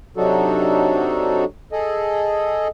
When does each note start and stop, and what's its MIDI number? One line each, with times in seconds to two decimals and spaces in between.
0.17 1.45 48
0.17 1.45 54
0.17 1.45 62
0.17 1.45 63
0.17 1.45 66
0.17 1.45 69
1.72 2.68 68
1.72 2.68 69
1.72 2.68 75